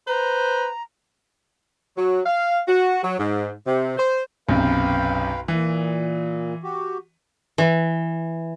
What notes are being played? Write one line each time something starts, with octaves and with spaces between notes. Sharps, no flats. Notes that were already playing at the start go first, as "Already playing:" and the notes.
B4 C5 A#5
F#3
F5
F#4
F#3
G#2
C3
C5
B1 F#2 C3 B4 F5 G5
A#2 E3
F#4 G4
E3